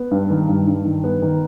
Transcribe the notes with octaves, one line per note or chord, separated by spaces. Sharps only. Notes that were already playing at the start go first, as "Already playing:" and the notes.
Already playing: B3
G2
D#3
G2
G2
D#3
B3
D#3